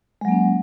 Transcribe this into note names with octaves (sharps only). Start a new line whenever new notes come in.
F#3 G#3 A#3 C#4